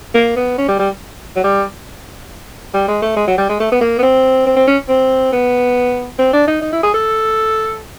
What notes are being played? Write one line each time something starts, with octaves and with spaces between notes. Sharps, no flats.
A#3
B3
C#4
G3
G3
F#3
G3
G3
G#3
A3
G#3
F#3
G3
G#3
A3
B3
A#3
B3
C4
C4
C4
C#4
C4
B3
C4
D4
D#4
D#4
E4
G#4
A4